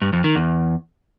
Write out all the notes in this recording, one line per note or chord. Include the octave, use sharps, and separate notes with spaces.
G2
F2
D#3
E2